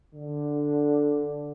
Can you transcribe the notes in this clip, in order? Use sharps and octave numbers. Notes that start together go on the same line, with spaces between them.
D3